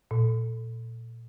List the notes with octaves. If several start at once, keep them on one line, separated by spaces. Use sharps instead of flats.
A#2